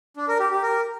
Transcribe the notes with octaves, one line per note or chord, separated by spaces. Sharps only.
D4
A#4
G4
G4
A#4